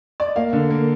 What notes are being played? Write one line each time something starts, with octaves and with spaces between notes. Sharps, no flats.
D5
D#5
A#3 F5
D3
A#3